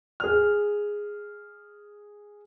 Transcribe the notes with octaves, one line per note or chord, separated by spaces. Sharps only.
G#4 F6